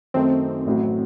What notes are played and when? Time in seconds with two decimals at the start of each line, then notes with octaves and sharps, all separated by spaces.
0.14 F#2 D#3 A3 C4 D#4
0.66 A1 A2 F#3